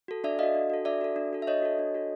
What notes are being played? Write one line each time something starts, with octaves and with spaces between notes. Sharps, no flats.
F#4 A4
D4 D5 E5
F#4 A4 D#5 F5
D4
F#4 A4
D4 D5 E5
F#4 A4
D4
F#4 A4
E5
D4 C#5 D#5
F#4 A4
D4
F#4 A4